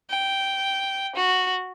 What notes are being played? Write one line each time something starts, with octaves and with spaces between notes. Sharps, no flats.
G5
F#4